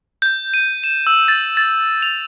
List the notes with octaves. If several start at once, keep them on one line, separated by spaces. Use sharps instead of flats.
G6
D#7
E7
E6
A6
A6
F7